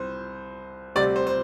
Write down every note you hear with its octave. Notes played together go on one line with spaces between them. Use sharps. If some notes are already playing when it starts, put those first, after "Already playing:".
Already playing: C2 C4 C5
D2 C3 G3 C4 D5
C5
C5